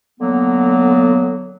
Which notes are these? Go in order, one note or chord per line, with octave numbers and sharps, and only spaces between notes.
D3 F#3 A#3 B3